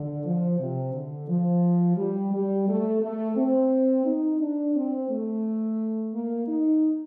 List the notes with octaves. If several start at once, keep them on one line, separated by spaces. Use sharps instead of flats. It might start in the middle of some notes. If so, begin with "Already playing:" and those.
Already playing: D3
F3
C3
D3
F3
G3
G3
A3
A3
C4
D#4
D4
C4
A3
A#3
D#4